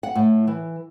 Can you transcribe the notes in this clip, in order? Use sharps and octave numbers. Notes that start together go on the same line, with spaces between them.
F#5
A2
E3